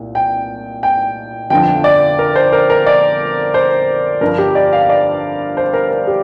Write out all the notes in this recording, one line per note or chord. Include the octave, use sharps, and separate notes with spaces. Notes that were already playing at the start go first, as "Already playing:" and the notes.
Already playing: C2 A#2
G5
G5
G1 F2 D3 F3 G5
D5
A#4
C5
A#4
A#4
D5
C5
G1 G2 F3 A#4
G4
D5
F5
D5
C5
A#4
A#4
G4